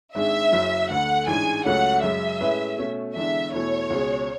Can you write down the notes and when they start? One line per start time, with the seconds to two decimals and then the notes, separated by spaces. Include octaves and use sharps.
0.15 G#1 G#2 G#3 D4 G#4 E5
0.52 F#1 F#2 C#3 F#3
0.89 D2 D3 A3 F#5
1.27 A1 G#2 G#3 D4 G#4 G#5
1.65 C#2 C#3 F#3 A3 C#4 F#5
2.03 F#2 C#3 G#3 E5
2.40 A2 G#3 C#4 G#4 B4
2.77 B2 A3 C#4
3.15 E1 E2 D3 G#3 D4 E5
3.52 E2 B2 A3 E4 C#5
3.90 C#2 B2 G#3 C#4 G#4